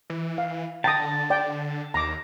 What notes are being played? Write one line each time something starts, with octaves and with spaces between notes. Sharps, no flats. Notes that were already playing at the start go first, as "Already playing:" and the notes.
E3
F5
D3 G5 A5 A#5 D#6
D5 G5
D#2 A#5 D6